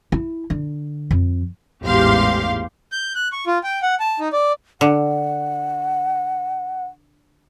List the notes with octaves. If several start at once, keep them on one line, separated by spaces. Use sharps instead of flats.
E4
D3
F2
A1 E2 G#2 G4 F5 C6
G6
F#6
C#6
F4
G5
F#5
A5
D#4
D5
D3 F#5